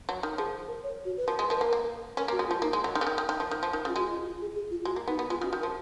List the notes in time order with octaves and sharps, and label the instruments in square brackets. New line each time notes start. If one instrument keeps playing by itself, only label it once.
[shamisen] F#3
D#3
[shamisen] F3 [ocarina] G#4
[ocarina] A#4
C#5
F#4
B4
[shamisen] F3 [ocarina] A#4
[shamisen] G#3
[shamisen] F3 [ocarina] A#4
[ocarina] B4
[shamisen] A#3
[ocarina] A#4
[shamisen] A#3
[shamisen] C#4 [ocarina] A#4
[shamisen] A#3
[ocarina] F#4
[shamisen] G#3
[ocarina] F4
[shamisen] F3
[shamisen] A#3 [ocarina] D#4
[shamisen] G#3
F#3
D#3
C#3
D#3
D#3
D#3
F3
D#3
F3
D#3
C#3
[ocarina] F4
[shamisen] G#3 [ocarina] F#4
[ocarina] F4
F4
G#4
G#4
F4
[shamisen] G#3 [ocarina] F#4
[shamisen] A#3
[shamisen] B3 [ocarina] D#4
[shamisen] B3
[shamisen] G#3 [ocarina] F4
[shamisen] C#3
[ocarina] F#4
[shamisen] D#3
[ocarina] A#4
[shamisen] F3